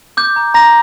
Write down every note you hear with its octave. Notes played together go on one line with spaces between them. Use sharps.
D6 G6
A#5
A#5 A#6